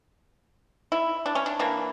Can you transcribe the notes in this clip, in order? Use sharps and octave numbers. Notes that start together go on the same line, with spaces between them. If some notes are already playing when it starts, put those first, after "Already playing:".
E4
D4
C#4
D4
E3 A#3 D4